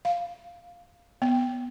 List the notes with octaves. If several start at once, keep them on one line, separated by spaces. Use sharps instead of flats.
F5
B3